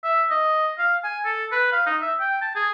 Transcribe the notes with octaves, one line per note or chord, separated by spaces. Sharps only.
E5
D#5
F5
G#5
A4
B4
F5
D#4
E5
G5
A5
G#4